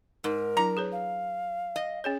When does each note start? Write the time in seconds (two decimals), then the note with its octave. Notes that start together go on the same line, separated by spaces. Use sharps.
0.24 G#2 A#4
0.57 F#3 D4 E4 A#5
0.77 G#4 B4 C#5
0.92 F5
1.76 D#5
2.04 C#4 G#4 C#5